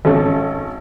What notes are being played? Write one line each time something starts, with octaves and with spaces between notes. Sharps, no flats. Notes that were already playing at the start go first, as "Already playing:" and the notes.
G#1 C#4 A4